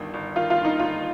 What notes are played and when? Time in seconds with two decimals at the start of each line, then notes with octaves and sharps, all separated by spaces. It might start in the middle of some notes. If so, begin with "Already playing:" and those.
Already playing: G1 G2 D#3
0.14 G1
0.36 D#3 F4
0.50 F4
0.58 G2
0.65 D#4
0.79 G1 F4